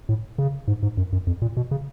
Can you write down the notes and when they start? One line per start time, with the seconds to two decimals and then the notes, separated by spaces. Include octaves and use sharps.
0.09 A2
0.38 C#3
0.68 G#2
0.83 G#2
0.97 F#2
1.13 F#2
1.27 F2
1.42 A#2
1.57 B2
1.71 C#3